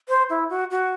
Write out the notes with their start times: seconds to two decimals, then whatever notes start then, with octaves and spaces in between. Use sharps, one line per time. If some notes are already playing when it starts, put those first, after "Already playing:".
0.09 C5
0.30 E4
0.50 F#4
0.71 F#4